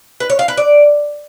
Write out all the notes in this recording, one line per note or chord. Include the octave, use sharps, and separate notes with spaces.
B4
C#5
F5
B4
D5